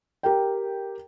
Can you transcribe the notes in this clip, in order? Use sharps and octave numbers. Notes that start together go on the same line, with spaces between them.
G4 A#4 G5